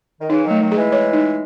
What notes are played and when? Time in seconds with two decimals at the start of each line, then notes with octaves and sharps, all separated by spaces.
0.20 D#3
0.30 C#3 E3 D#4
0.45 D#3 F#3
0.51 A3
0.61 D#3 F#3
0.72 G#4
0.77 E3 G#3
0.92 C#5
1.13 D#4